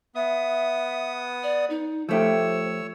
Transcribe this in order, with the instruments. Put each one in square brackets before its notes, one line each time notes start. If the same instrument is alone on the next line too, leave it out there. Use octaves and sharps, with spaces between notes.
[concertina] B3 D#6 [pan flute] E5
[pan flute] D5
D#4
[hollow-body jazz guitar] F3 A3 G4 [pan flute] C5 [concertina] C#5 E6